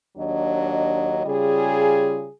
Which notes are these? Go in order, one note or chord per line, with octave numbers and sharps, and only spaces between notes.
D#2 F#3 D4 D#5
C#3 G3 F4 G#4